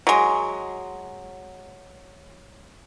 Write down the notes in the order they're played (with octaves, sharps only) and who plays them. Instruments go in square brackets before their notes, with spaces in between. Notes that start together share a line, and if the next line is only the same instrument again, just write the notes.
[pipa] F#3 G#3